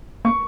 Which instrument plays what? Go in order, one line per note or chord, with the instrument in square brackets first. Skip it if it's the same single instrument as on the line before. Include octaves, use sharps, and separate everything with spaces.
[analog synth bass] A#3 [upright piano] C#6